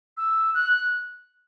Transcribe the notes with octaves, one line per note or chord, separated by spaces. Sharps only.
E6
F#6